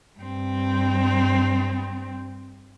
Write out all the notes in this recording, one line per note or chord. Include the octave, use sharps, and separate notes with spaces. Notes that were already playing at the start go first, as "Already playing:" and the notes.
G2 C4